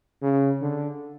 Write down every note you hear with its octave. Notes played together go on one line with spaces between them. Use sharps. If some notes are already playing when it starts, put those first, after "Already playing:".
C#3
D3